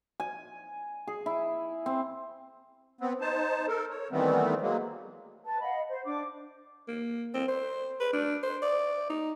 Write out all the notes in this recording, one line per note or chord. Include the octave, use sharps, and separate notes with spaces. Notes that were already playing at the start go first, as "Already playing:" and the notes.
G#5
G#4
E4
C4
B3 C4
D#4 C5 A5
A4 A#4
C#5
D#3 E3 G3 A3 B3 C4
F#3 G#3 A#3
B4 A5
D#5 F5 F#5 B5
C5
D4 D6
A#3
C4
C5
B4
D4
C5
D5
D#4